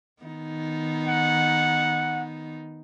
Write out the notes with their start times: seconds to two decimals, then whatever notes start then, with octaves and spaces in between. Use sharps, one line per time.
0.23 D#3 B3 D#4
1.08 F#5